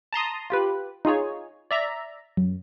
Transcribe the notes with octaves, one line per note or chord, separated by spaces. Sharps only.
A5 A#5 C6 D#6
F4 G4 B4
D#4 F4 G#4 C#5
D5 E5 A#5
F#2